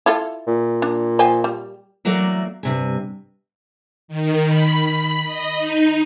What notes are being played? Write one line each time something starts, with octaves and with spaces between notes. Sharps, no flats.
E4 F4 A4
A#2
D4
F3 G5 G#5
G3
E3 F#3 A3 A#3 D5
G2 C3 G#5
D#3
B5
D#5
D#4